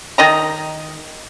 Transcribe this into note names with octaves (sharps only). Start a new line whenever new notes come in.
D#3 D#5 A#5